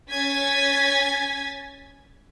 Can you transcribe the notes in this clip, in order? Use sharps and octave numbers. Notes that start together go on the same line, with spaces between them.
C#4 G#5 G#6 A6 B6